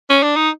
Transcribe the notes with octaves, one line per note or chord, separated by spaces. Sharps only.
C#4
D4
D#4